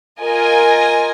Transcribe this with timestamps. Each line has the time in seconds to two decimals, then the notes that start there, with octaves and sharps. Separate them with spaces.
0.19 F4 A#4 D#5 G#5